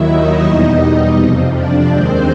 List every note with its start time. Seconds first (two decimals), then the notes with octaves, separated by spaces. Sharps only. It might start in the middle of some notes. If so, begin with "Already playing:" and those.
Already playing: D#2 D#3 F#3 E4 E5
0.09 D#4 D#5
0.45 E2 B2 G3 D#4 D#5
1.16 F2 C3 F3
1.53 D4 D5
1.89 D#2 D#3 G#3 C4 C5